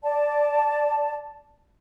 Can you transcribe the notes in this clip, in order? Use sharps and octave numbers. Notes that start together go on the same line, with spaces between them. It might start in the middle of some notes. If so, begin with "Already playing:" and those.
D5 A5